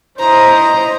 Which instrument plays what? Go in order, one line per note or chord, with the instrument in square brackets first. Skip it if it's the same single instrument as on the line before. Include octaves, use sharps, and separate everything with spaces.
[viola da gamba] E4 D#5 [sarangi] C5 [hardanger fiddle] A#5